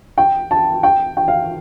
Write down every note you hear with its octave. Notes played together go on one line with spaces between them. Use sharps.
G5
A5
G5
G5
F5